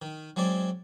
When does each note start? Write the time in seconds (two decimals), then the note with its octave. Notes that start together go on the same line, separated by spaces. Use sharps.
0.02 D#3
0.36 F#3 G#3 C4 D5